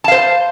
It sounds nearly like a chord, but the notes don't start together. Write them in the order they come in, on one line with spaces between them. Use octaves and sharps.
A5 F5 C5